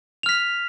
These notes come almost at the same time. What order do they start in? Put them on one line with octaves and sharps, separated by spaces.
F7 F6 B6